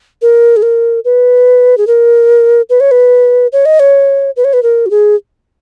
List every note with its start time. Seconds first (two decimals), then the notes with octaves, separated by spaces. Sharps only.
0.22 A#4
0.57 G#4
0.62 A#4
1.05 B4
1.78 G#4
1.87 A#4
2.70 B4
2.80 C#5
2.91 B4
3.53 C#5
3.66 D#5
3.80 C#5
4.36 B4
4.44 C#5
4.53 B4
4.63 A#4
4.86 F#4
4.90 G#4